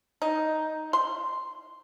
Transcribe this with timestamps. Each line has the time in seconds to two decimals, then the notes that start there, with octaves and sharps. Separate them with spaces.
0.22 D#4
0.93 C6